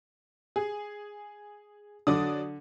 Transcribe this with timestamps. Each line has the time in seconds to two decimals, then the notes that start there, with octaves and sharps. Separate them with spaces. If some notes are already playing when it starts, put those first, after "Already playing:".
0.56 G#4
2.07 D3 F#3 D5 D#6